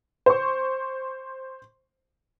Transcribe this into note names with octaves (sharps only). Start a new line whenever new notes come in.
C5 C#6